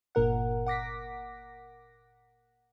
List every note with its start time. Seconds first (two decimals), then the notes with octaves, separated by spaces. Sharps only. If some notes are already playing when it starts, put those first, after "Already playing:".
0.15 G1 A#2 A#4 F#5
0.67 F#5 D6 A#6 B6